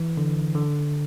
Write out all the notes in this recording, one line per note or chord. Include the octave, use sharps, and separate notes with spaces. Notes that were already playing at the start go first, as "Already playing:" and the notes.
Already playing: E3
D3
D3